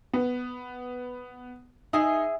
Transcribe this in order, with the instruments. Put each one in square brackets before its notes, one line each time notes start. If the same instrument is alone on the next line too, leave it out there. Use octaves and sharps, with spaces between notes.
[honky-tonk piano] B3
[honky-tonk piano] D#4 [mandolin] E4 G#4 G#5